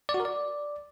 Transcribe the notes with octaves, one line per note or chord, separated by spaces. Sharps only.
D5
F#4
A#4
D5